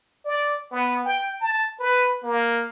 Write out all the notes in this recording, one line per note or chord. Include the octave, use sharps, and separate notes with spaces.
D5
B3
G5
A5
B4
A#3